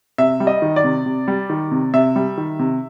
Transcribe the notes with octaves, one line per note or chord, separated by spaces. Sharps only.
C3 E5
G3
D#5
D#3
D5
C3
C3
G3
D#3
C3
C3 E5
G3
D#3
C3